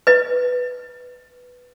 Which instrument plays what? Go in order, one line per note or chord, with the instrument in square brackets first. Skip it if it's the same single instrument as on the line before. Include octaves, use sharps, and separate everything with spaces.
[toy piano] B4 D#5